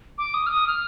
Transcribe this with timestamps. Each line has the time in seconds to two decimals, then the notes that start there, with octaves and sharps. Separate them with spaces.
0.18 D6
0.34 D#6
0.46 F6
0.51 D#6
0.67 F6